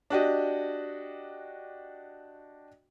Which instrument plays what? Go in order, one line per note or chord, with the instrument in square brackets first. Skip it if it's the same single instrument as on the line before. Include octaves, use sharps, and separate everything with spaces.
[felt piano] D4 F#4 G4 D#5